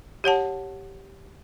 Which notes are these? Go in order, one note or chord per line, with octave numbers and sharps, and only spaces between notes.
G4 C#5 F#5 A5